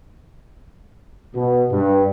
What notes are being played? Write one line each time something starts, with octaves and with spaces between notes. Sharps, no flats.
B2
G2